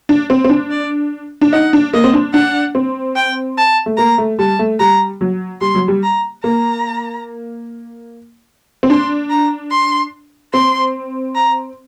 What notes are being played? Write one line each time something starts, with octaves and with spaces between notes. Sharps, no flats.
D4
C4
C4
D4
D5
D4
D#4 F#5
D4
A#3 D#5
C4
D4
D4 F#5
C4
G5
A5
A3
A#3 A#5
A3
G3 A5
A3
G3 A#5
F#3
G3 C6
F#3
G3
A#5
A#3 A#5
C4
D4 C6
A#5
C6
C4 C6
A#5